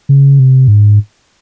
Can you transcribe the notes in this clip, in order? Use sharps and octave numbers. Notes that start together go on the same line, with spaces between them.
C#3
C3
G#2